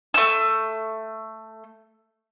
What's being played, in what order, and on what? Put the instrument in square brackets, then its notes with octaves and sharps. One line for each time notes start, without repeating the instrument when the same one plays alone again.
[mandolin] A3 E6